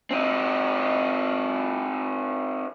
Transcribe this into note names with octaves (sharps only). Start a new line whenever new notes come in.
C4 D#4